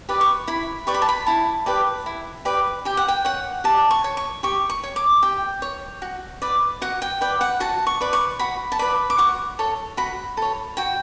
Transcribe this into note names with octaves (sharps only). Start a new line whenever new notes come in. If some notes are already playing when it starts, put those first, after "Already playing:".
G4 B4 D5
C#6
E4 B5
G4 B4 D5 C#6
B5
A5
B5
E4 A5
G4 B4 D5
E4
G4 B4 D5
G4 G5
F#5
G5
C#5 F#5
G4 A5
C#6
C#5
C#6
G4 C#6
C#6
C#5
D6
G4 G5
C#5
F#4
B4 D5
F#4 F#5
G5
B4 D5 G5
F#5
F#4 A5
C#6
B4 D5
C#6
F#4 B5
A5
B4 D5 B5
D6
F#4 C#6
A4 C#5
F#4 B5
A4 C#5
F#4 G5